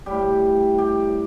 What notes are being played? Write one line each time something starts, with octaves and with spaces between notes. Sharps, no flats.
A2 G3 G4
G4